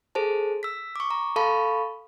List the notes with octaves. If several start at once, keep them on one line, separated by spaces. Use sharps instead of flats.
G#4 A4 C5 A5
E6 B6
C#6 D6
A#5
A4 F5 A5 B5 C#6